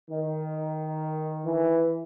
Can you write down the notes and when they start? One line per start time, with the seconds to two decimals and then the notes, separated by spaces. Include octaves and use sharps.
0.10 D#3
1.46 E3